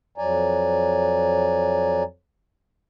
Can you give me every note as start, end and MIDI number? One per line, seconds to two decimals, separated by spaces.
0.18 2.03 41
0.18 2.03 54
0.18 2.03 74
0.18 2.03 80
0.18 2.03 82